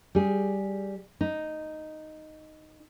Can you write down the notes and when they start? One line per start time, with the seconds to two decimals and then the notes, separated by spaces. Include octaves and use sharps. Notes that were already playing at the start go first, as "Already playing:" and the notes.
0.15 G3 G#4
1.21 D#4